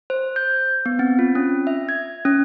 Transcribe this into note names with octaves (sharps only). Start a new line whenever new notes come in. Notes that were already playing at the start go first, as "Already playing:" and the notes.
C5
G6
B3
C4
F4
C#4
E5
G#6
C#4